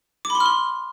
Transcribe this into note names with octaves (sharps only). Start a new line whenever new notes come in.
D6
B5
C6
F6
C6